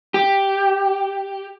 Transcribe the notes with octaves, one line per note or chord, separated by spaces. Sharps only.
G4